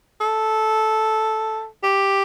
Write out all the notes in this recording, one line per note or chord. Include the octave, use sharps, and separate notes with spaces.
A4
G4